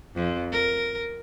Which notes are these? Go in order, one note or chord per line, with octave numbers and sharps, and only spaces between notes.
F2
A#4